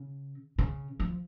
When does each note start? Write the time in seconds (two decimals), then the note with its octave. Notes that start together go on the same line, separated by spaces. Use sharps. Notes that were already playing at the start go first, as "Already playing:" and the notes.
Already playing: C#3
0.58 C#3
1.00 F3